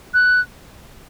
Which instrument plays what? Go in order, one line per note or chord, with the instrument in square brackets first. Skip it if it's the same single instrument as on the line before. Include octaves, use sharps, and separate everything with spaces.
[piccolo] F#6